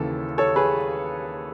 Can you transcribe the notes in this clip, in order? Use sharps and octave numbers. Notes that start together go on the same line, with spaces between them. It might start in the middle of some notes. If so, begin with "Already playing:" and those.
Already playing: D#2 C#3 E3 A4
A4 C#5
G#4 B4